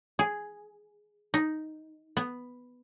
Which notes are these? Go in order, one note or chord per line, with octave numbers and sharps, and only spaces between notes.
G#4
D#4
B3